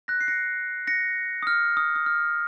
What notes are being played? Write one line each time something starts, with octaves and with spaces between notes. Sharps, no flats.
F#6 A#6
C7
A#6 C#7
A#6 C#7
D#6
F6
D#6
D#6
F6